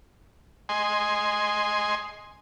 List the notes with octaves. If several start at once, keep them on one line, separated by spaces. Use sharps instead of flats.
D#5 G#5 C6